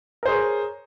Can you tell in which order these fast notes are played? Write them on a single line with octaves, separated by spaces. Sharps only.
A#4 C5 G#4 C#5